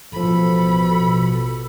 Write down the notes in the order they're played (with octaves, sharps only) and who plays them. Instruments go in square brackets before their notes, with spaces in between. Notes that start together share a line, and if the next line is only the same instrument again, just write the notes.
[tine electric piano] A1 F3 [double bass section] B2 [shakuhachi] A4 [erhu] B5